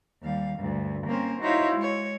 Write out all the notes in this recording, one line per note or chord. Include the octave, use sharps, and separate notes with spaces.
D#2 G3 F5
D2 G2
A#3 C4 C#4 A#4 C5
D#4 E4 F#4 C5 C#5 F5
G#3 C#5